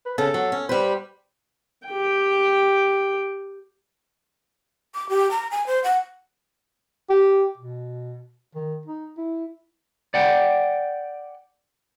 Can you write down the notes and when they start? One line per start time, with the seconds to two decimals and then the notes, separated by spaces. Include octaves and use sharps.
0.06 B4
0.18 C#3 A4
0.34 F#3
0.52 C#4
0.69 G3 B4 C5
1.87 G4 G5
4.95 D6
5.09 G4
5.31 A#5
5.51 G#5
5.67 C5
5.84 F#5
7.10 G4
7.57 B2
8.55 D#3
8.86 D#4
9.17 E4
10.14 D5 F#5 G5